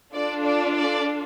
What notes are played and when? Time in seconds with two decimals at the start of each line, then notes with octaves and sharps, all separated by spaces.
0.13 D4 F4 A4 D5
0.44 D5
0.75 D5